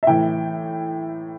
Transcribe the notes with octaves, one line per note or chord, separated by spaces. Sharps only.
E5
A2 E3 G5